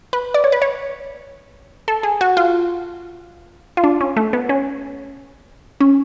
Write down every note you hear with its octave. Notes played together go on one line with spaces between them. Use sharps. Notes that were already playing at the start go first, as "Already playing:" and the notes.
B4
D5
C#5
B4
C#5
A4
G#4
F#4
F4
F4
D4
C#4
A3
B3
C#4
C#4